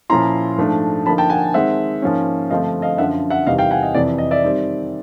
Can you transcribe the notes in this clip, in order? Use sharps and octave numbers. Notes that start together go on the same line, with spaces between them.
A#2 F3 A#3 C#4 E4 A#5 C6
G#2 F3 A3 D4
D3 F3 A#3 D#4 A5 B5
G5 A5
F#5 G#5
D#3 G#3 C4 E5 F#5
G#2 F3 A#3 C#4
G2 D3 F3 A3 C4 D#5 F5
D#5 F5
F#2 D3 F3 E5 F#5
E5 F#5
E2 C3 D#3 G3 D#5 F5
F5 G5
F#5 G#5
D#5
F2 C3 E3 D5
D#5
D5 E5
D#3 G3 C4